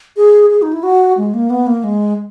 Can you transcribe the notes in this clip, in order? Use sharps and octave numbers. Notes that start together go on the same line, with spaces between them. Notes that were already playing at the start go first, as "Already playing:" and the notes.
G#4
G#4
D#4
E4
F#4
G#3
A#3
B3
A#3
G#3